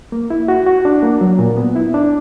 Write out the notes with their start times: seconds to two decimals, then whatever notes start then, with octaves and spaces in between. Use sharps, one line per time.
0.12 A#3
0.30 E4
0.48 F#4
0.66 F#4
0.85 D4
1.02 A#3
1.21 F#3
1.39 A#2
1.57 B3
1.76 E4
1.94 D4